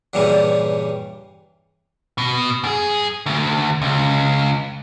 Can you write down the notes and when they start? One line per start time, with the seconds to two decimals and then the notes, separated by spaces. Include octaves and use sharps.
0.13 G2 A#2 C#3 E3 G3
2.18 B2
2.64 F#2 G#4
3.26 D2
3.82 C#2